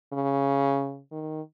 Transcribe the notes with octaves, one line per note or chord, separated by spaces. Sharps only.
C#3
D#3